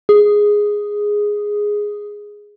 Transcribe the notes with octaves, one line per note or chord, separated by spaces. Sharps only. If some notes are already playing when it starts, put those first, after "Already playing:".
G#4